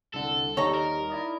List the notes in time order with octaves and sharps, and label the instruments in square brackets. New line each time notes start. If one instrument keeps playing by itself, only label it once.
[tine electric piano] C2 D3 [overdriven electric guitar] A4
[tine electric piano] D#2 G3 [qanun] D#4 [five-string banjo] C#5 A#5
[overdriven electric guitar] A#4
[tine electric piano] E4 D5 D#5